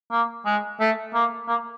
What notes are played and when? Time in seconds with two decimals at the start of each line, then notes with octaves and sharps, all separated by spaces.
0.11 A#3
0.46 G#3
0.80 A3
1.14 A#3
1.48 A#3